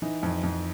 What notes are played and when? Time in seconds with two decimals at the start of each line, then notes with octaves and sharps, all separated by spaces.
0.02 E3 D#4
0.23 F2
0.43 F2